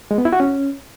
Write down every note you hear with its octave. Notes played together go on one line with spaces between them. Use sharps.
G#3
B3
E4
F#4
C#4